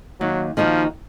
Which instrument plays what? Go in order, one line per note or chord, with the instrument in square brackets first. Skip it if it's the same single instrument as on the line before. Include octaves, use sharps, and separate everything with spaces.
[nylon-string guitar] D#2 [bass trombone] F#3
[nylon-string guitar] D#3 A#3 D#4 F#4 [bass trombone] F3